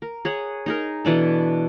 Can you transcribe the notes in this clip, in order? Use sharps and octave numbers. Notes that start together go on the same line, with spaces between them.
A#4
G#4 C#5 F#5
D#4 G#4 A#4
B2 E3 D4 A4